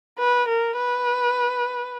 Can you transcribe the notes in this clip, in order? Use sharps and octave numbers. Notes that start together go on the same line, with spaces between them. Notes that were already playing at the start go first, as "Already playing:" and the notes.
B4
A#4
B4